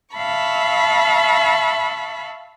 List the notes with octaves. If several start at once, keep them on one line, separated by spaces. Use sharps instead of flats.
E5 F5 A5 B5 C#6